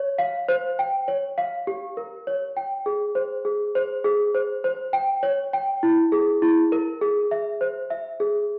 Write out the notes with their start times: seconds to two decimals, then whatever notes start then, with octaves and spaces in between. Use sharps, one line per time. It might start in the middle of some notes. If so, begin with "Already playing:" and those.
Already playing: C#5
0.18 F5
0.48 C5
0.79 G5
1.08 C#5
1.38 F5
1.67 G4
1.97 A#4
2.27 C#5
2.57 G5
2.86 G#4
3.15 C5
3.45 G#4
3.75 C5
4.04 G#4
4.34 C5
4.64 C5
4.93 G5
5.23 C#5
5.53 G5
5.83 E4
6.12 G#4
6.42 E4
6.72 A#4
7.01 G#4
7.31 E5
7.61 C5
7.90 E5
8.20 G#4